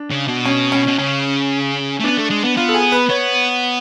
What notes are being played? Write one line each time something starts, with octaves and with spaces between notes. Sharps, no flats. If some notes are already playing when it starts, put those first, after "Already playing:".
Already playing: D4
C#3
B2
C#4
C#4
B2
C#3 C#4
A3
B3 D4
A3
G#3
B3
B3 F4
A4
G#4
B4
B3 C#5